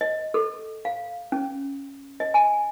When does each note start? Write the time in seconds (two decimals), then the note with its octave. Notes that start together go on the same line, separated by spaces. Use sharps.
0.01 D#5
0.34 A4
0.85 F5
1.32 C#4
2.20 D#5
2.34 G#5